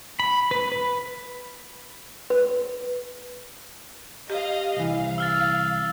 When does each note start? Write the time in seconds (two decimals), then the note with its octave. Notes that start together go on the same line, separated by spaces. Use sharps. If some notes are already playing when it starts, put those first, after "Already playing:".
0.20 B5
0.51 B4
0.72 B4
2.30 B4
4.30 G4 D#5 F5
4.77 C2 E3 F5
5.18 E6 F6 A6